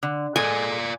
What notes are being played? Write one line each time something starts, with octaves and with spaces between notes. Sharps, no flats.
D3
G#3 F4 A4 D5 G#5